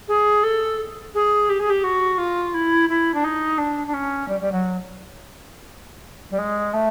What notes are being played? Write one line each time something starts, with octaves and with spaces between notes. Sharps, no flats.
G#4
A4
G#4
G4
G#4
G4
F#4
F4
E4
E4
D4
D#4
D4
D4
C#4
G3
G3
F#3
G3
G#3
A3